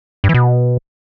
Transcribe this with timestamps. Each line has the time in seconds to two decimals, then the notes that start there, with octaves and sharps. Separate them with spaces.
0.24 G2
0.29 E3
0.34 B2